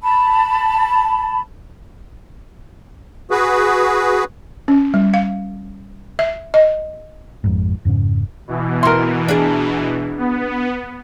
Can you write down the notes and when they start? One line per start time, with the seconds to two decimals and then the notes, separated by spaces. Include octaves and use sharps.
0.02 A5 B5
3.31 F#4 G#4 B4
4.68 C#4
4.94 G3
5.14 F5
6.19 E5
6.54 D#5
7.44 G#1 F2 G#2
7.85 F2 G#2 C#3 C#4
8.48 B2 E3
8.83 E4 F#4 A#4 C6
9.28 D4 G#4
10.18 B3